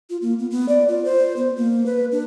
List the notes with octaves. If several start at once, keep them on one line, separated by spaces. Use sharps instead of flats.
F4
A#3
B3
B3
D5
F4
C5
B3
A#3
B4
D4